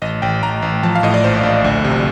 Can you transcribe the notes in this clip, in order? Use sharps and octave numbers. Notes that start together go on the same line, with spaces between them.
A1 D#5
A1 G5
A1 A#5
A1
F3 A5
F5
A2 D#5
D5
A#1 C5
A#1
D2
C3